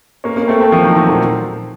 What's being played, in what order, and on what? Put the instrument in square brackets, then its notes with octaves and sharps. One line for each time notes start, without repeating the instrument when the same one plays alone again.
[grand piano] A#3 C#4
A#3 C#4
A3 C4
A3 C4
F3 A3
D#3 F#3
D#3 F#3
A#2